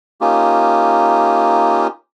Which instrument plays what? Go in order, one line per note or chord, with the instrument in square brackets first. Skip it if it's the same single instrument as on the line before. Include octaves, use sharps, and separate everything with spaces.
[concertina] A#3 C#4 D#4 F4 G4